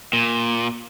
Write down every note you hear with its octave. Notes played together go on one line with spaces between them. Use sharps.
A#2